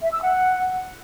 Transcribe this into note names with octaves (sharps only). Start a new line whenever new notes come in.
E5
E6
F#5